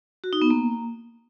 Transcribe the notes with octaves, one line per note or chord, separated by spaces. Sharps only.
F#4
D#4
B3
A#3